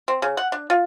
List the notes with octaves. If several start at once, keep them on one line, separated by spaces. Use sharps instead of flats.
C4
C#3
F#5
D4
F4